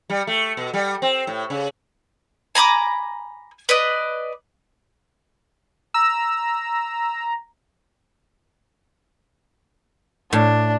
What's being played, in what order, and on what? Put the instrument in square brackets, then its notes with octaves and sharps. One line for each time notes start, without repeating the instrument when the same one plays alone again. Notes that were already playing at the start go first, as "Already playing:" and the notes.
[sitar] G3
A3
B2
G3
C4
A2
C#3
[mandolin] G#5 A#5 B5 D6
B4 D5 D#5
[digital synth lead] A#5 [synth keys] E6
[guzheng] A2 [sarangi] D4